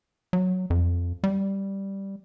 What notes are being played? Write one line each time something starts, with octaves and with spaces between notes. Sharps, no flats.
F#3
F2
G3